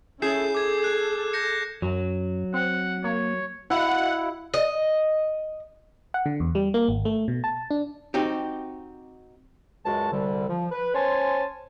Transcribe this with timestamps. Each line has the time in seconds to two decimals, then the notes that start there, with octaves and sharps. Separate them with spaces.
0.22 C#4 E4 G#4 A4 G6 C7 E7
0.55 A4 D6 G#6
0.84 F#6
1.33 G6 A#6 C#7
1.82 F#2 F#3
2.54 C4 F#5
3.04 A#3 C#5
3.70 E4 F#4 D#5 F5 F#5
4.54 D#5
6.14 F#5
6.26 D3
6.40 E2
6.55 G3
6.74 A#3
6.88 G#1
7.05 A3
7.28 B2
7.44 A5
7.71 D4
8.14 C4 D#4 F#4 G4
9.85 C#2 F#2 G#3 F#4 A5
10.12 C2 D3 G3
10.48 F3
10.71 B4
10.94 C#4 C5 C#5 G#5 A5 C6